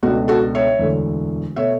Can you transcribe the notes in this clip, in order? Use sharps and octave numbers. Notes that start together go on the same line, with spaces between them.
C#2 B2 A3 D4 F#4
F#4 A4
C#5 E5
E1 D2 D3 A3
B2 A3 C#5 E5